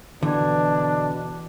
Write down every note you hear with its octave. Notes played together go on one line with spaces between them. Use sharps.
B2 D3 E3 D4 G4 G#6